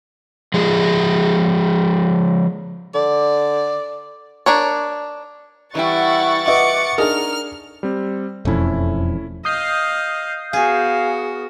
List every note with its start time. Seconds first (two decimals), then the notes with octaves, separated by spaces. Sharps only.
0.54 F3 G#3 G#4
2.94 D3 D5
4.46 D4 A#4 C#5
5.75 E3 G3 E4 F#5 G5 C#6 A6
6.48 B4 D#5 E5 D6 C#7
6.98 D4 D#4 G#4 A#4 D#6 F6
7.83 G3 C4
8.45 E1 F2 A3 C#4 E4
9.45 D#5 F5 D#6 G6 C7
10.53 B3 F#4 G#4 F5